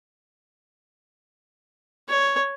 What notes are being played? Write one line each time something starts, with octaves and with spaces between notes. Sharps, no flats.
C#5